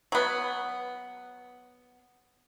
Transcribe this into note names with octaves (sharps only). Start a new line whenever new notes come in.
F#3 B3